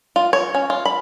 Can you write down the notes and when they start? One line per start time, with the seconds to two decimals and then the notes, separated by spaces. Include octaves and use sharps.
0.16 F4
0.33 C#5
0.55 C#4
0.70 F4
0.85 B5